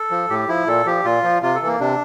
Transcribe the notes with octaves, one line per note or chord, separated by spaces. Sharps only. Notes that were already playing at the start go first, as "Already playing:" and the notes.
Already playing: A4
F3
A2 G4
F3 E4
A#2 A4
F3 G4
A#2 F4
F3
C3 F4
A4
E3
A#3
C3 D4